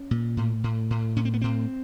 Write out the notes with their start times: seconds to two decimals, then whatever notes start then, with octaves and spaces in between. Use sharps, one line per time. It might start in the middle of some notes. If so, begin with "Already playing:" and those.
Already playing: C#4
0.11 A#2
0.37 A2
0.64 A2
0.90 A2
1.16 A2 C#4
1.25 C4
1.34 B3
1.41 A2 C4